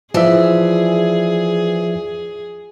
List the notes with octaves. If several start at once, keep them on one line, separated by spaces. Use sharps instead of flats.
E3 F3 G#4 D5 E5